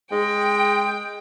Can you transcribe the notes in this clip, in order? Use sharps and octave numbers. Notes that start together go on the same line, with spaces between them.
G#3 G5